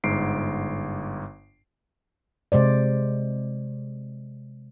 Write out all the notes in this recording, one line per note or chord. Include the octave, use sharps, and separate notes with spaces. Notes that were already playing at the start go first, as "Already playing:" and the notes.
G1 G#2 C7 D7
C3 G#3 C5 D5